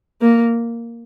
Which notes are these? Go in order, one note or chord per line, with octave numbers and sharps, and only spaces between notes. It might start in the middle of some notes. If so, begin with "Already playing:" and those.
A#3